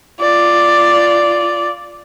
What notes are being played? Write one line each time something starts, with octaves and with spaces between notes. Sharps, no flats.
F4 D5